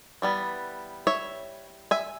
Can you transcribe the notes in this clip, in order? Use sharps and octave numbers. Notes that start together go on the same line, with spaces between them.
E3 G3 B3
C#5 E5
E5 G#5